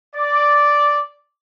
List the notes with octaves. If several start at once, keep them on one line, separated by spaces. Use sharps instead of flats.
D5